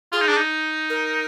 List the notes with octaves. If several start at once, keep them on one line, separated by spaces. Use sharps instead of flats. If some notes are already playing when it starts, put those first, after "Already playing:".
F4 G#4
D#4
D4
D#4
A#4